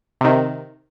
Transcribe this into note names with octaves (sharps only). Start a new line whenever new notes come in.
C3 D#3